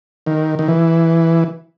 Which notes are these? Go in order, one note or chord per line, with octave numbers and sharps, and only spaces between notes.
D#3
D#3
E3